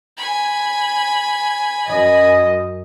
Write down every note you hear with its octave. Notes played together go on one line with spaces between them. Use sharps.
G#5 B5
F#2 D#5